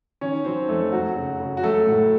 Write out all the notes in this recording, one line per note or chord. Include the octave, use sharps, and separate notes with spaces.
D#3 C#4 C#5
F#3 C4 C5
F2 A3 A4
F#2 F#3 F#4
C#3
C#3
F#4
F#3 A3 A4
A2